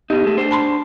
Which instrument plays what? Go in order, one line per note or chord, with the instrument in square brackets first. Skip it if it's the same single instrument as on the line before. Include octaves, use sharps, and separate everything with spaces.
[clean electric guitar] B2 D#4 [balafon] G4
[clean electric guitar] G#3 A3
D4 C5
[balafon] A5 B5 C6